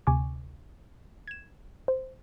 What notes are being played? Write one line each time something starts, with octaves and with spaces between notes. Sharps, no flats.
D2 C3 G#5 C#6 D6
G#6 E7
C5